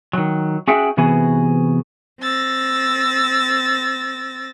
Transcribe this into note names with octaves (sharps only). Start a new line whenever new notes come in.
D#3 F#3
C#4 F#4 G#4 E5 F#5 G5
C3 E3 B3 F#4 G#4
C4 E6 A6 A#6